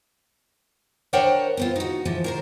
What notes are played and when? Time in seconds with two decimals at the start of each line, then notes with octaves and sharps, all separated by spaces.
1.13 D4 A#4 C5 C#5 F#5 G5
1.57 B3 C4 F4
1.76 D#4 F#4
2.05 E3 F3
2.24 D#3 A#4 C5